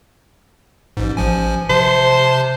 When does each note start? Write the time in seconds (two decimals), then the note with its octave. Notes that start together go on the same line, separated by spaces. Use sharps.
0.97 A1 G#2
1.17 A1 F3 G#5
1.70 C3 C5 A5